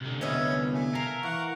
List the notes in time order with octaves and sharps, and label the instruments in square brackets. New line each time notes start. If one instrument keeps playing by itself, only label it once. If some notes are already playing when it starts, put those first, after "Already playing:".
[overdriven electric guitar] C2 D3
[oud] B3 C#5 D#5 [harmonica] C#4 E5
[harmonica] A3 G#5
[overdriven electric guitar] A#4 [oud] F5
[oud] E3 [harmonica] F5 F#5 C#6